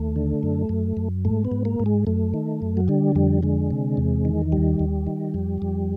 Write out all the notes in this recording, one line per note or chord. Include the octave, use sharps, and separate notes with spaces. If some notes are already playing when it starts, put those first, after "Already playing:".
Already playing: D#2 A3
D3
F#2
F#2
F#2
G#2 A3
B3
G#2
A#3
G#2
G#3
F#2 A3
D#3
F#2
F#3
D3 G3
F2 G3
D3 G#3
C3
E2
D#3
D#2 G3
D#2
D#3
F2
F2